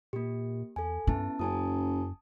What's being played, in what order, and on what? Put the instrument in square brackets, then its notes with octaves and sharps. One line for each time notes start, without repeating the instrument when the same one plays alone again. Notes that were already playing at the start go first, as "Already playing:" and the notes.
[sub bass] A#2 [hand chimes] A#3 G4
[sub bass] E2 [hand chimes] A4 G#5
[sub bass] G2 [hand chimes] B3 E4 A5 [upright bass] C#4
[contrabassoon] F#1 [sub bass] F#2 [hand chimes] G#5 A5 D#6